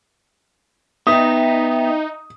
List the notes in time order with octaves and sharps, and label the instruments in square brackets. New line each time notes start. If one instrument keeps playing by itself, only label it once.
[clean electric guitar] B3 [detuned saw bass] D#4 [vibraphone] E5 G5 [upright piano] D#6